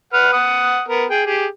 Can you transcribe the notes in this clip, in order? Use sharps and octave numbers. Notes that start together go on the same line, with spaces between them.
B4 F#5 F6
F#5 D#6
B3 A#4
G#4 G5
G4 G#4